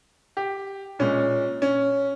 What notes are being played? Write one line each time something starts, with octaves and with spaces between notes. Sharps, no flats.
G4
A#2 G#3 C#4
C#4